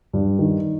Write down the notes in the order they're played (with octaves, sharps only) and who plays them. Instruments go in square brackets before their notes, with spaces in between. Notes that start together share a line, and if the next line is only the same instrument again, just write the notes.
[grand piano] G2
D#3